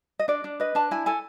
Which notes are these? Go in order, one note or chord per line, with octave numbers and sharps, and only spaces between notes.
D#5
D4 D5
D4
B4 D#5
D4 A5
E4 G#5
A4 G#5